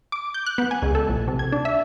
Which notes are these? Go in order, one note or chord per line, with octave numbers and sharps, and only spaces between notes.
D6
G6
F#6
B3
G#5
C#2
A4
A#1
C3
G#6
D4
E5